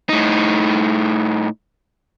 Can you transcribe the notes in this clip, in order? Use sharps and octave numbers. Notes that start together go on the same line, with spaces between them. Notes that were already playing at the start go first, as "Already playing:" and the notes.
A2 D#4